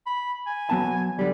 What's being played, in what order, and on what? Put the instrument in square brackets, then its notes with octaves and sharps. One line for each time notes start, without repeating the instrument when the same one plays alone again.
[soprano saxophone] B5
G#5
[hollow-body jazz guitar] F#3 B3 A5
[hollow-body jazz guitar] D3 G3 [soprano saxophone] D5